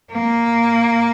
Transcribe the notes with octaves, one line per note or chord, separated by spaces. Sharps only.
A#3